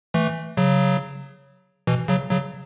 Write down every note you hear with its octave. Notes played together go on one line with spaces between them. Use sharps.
E3 A3
C#3 F#3
B2 E3
C#3 F#3
C#3 F#3